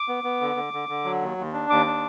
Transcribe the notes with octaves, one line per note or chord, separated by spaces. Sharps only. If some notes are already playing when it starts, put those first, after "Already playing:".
Already playing: D6
B3
B3
D3
D3
D3
D3
F#3
D#2
D#2
D4
D#2 D6
D4